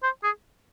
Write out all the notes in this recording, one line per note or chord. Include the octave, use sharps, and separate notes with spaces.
C5
G#4